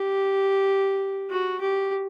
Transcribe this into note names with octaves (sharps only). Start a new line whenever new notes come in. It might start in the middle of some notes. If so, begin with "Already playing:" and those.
Already playing: G4
F#4
G4